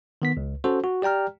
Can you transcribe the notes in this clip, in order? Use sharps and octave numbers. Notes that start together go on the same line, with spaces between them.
D#3 B3 B6
C#2
C#4 F#4 A4 C5
F#4
G4 D5 G5 A#5 F6